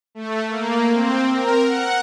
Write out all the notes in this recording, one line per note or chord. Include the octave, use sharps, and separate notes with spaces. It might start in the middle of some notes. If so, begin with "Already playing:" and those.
A3
A#3
C4
A#4
F#5